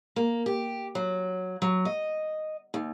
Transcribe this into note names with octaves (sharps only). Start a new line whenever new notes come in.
A#3
G4
F#3
F#3
D#5
D#2